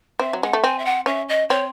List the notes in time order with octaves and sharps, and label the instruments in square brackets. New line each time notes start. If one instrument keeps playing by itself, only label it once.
[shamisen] C4 [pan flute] E5
[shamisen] F#3
[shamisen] G#3 [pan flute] F#5
[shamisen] A3
[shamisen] C4 [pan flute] G#5
[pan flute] E5
F#5
[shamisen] C#4 [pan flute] E5
[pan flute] D#5
[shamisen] C4 [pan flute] C#5